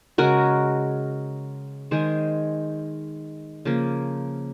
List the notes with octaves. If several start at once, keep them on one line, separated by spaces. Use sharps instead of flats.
C#3 G#3 F#4 A#4
D#3 G#3 G#4 C5
C#3 F3 A#3